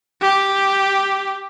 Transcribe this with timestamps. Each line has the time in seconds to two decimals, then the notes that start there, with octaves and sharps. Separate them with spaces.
0.21 G4